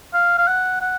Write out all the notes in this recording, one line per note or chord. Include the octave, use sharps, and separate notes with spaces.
F5
F5
F#5
F#5